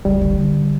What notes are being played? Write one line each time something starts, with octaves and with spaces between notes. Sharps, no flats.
C3 G3
C#3
D3
D#3
D3